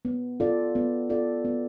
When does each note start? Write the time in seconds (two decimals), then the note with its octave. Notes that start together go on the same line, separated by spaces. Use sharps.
0.05 B3
0.40 F4 A4 D5
0.75 B3
1.10 F4 A4 D5
1.45 B3